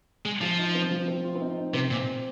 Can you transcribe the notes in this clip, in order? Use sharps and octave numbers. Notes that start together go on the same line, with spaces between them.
G#3
F3 F4
D#4
C4
F3
C4
F4
C4
D#4
D#4
C3 C4
A#2